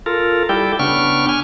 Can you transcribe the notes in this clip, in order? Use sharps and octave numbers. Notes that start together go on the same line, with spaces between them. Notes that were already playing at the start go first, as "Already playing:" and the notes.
F4 A4 A#4
G3 E4 G4 A4 G5
C#3 B3 D4 G5 C#6 F6
G#5 F6